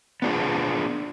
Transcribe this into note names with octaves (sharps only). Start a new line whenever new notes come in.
B3 D4 F4 G#4